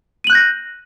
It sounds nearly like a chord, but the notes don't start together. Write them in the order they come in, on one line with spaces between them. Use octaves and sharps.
D#7 F#7 F#6 G6 A#6